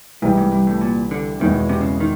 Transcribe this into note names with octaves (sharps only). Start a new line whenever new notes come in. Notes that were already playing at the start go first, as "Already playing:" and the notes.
C2 G#2 C3 E3 G3
G#2
G2
A2
A#2
D3
E2 B2 D#3 G#3 B3 E4
C3
C#3
D#3